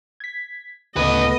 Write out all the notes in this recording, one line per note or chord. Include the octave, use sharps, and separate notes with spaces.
G#6 B6
D2 A2 C#3 A3 B3 B4 D#5